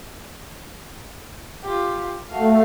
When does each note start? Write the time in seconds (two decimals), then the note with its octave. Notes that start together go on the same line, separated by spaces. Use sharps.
1.63 F4 G4
2.30 A3 F#4 F5